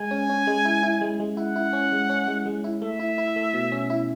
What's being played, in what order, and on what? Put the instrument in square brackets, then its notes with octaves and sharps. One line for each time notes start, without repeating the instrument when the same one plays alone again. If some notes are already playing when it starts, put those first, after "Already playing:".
Already playing: [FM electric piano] G#3 [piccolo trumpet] G#5
[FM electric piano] C#4
C#4
G#3
E4
E4
G#3
G#3
[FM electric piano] E4 [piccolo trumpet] F#5
[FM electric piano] E4
C#4
G#3
C#4
G#3
G#3
E4
[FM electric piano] A3 [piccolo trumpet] E5
[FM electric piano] E4
E4
A3
B2
C#4
E4